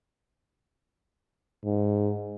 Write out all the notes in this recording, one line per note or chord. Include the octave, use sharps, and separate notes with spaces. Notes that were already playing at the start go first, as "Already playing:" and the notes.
G#2